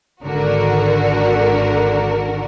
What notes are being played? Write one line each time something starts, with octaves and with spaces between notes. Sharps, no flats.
G#1 D3 F#4 A#4